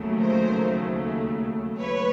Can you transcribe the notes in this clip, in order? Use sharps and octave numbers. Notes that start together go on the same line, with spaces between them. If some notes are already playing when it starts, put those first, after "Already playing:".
Already playing: D#2 C#3 F#3 A3
A#4 C5
B4 C#5